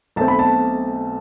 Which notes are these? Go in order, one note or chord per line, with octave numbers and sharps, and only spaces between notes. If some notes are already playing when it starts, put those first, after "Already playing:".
B1 B2 A3 C4 A5
B5
A5